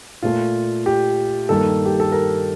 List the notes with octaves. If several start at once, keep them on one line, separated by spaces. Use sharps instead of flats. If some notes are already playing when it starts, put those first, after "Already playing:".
A#2 A3 F4
G4
G2 D#3 A#3 A4
G4
A4
A#4